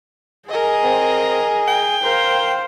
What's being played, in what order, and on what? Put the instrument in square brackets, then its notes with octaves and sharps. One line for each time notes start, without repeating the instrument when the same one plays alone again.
[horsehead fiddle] G#4 G#5 [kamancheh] A#4 D#5
[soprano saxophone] C4
G5
[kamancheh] A#4 [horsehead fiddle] C5 F5